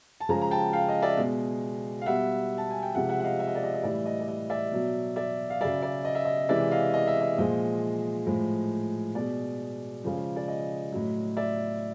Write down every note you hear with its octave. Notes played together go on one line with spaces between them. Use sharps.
A5
C#3 F3 G#3 G#5 A#5
A#5
G5 A5
F5 G5
D#5
D5 E5
B2 G#3
F5
B2 G3 E5 F#5
A5
G#5
G5
C3 F3 G#3 E5 F#5
E5 F#5
F#5
D#5 F5
E5
D#5
D5
D#5
D#5
A2 E3 G3 D5 E5
D#5
D5
D#5
D5 E5
B2 F#3
D5 E5
F5
C#3 F#3 D5 E5
D5
D#5
E5
D#5
C3 E3 G#3 D5 E5
D#5 F5
D#5
E5
D#5
A#2 F3 G#3 D#5
A2 F3 G#3
B2 G#3 D5
C#3 F3 G#3
D5
D#5
A2 F#3
D5 E5